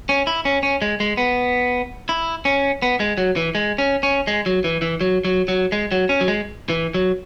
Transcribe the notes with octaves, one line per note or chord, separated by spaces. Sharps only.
C#4
E4
C#4
C#4
G#3
G#3
B3
E4
C#4
B3
G#3
F#3
E3
G#3
C#4
C#4
G#3
F#3
E3
E3
F#3
F#3
F#3
G#3
F#3
C#4
F#3
G#3
E3
F#3